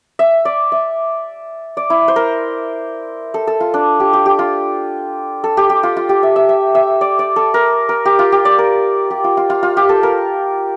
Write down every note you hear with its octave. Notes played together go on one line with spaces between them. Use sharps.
E5
D5
E5
D5
E4
C5
A#4
A4
A4
F4
D4
G4
G4
G4
F4
A4
G4
G4
F4
F4
G4
E5
E5
E5
E5
D5
D5
A4
A#4
A#4
G4
F4
G4
D5
A#4
G4
F4
F4
F4
F4
G4
A4
A#4